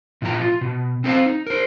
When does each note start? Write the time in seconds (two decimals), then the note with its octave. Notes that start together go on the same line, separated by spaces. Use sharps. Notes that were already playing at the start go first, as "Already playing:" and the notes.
0.22 A#2 F3 E4 B4 A#5
0.41 F4
0.61 B2
1.04 C4 A4 C5 E5 F5
1.26 D#4
1.47 A#4 C5